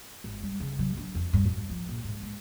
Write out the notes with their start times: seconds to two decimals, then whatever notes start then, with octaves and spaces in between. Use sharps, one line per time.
0.24 G#1
0.43 G3
0.60 C#3
0.79 F#3
0.97 D4
1.15 F2
1.33 G2
1.50 F#3
1.70 F3
1.89 A#1
2.04 G#2
2.22 G#3